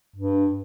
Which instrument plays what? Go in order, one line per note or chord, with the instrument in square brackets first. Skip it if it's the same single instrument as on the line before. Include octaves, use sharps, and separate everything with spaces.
[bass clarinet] G2